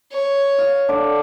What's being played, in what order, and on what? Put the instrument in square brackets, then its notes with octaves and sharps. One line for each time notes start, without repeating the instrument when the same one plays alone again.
[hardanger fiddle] C#5
[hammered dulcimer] F5
D3 D5 F5